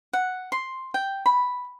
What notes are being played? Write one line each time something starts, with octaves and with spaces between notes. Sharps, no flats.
F#5
C6
G5
B5